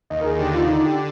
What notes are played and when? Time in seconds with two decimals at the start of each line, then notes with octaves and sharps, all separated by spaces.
0.10 D#2 D#5
0.20 A#4
0.24 G#4
0.39 D3 G4
0.53 F4
0.66 D3 D#4
0.85 G4